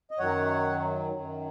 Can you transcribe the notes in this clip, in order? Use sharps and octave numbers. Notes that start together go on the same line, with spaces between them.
D#5
F#2 D#3 F#3 C#5 F#5
F#2 D#3 F#3